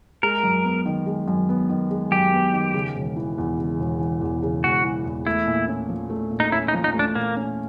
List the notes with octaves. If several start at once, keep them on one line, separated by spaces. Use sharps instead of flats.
G#3 A#4
F#2
B3
D#3
G#3
F#2
B3
D#3
G#3
F#2 G4
B3
D#3
C#3
E1
E3
E2
C#3
E1
E3
E2
C#3
E1 F#4
E3
E2
A3 E4
A#2
C#4
F3
A3
A#2
D#4
C#4 E4
D#4
F3
D#4
A3
D4
A#2 A#3
C#4